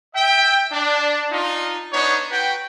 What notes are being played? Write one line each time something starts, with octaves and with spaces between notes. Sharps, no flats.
E5 G5
D4
D4 D#4 F4
B3 D4 D#4 C#5
F#4 B4 G5